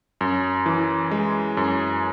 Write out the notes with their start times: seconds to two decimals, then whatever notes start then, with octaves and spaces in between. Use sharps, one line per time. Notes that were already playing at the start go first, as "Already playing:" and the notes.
0.21 F#2
0.66 E3
1.11 G#3
1.57 F#2